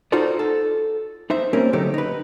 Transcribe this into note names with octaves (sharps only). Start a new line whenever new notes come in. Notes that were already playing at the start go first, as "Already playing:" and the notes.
D#4 F4 F#4 A4 C5 D5
A4
D#4 C5 E5
G3 A#3 C4 C#4 A#4
D3 F#3 A3 D#4 G4
D#4 B4